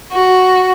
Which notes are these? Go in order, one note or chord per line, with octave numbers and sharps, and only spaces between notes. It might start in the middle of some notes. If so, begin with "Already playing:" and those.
F#4